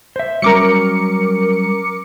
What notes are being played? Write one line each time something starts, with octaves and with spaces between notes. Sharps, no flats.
C5 E5
F#3 G3 C#4 A#4 D6 C#7